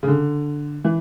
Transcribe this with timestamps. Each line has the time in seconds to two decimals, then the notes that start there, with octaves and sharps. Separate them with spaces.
0.03 C#3
0.07 D3
0.85 E3